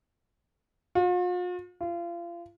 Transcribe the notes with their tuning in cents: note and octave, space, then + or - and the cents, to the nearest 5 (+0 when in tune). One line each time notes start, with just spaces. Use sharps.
F4 +45
F4 -30